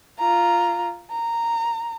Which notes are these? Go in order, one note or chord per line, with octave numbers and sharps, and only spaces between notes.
F4 A#5
A#5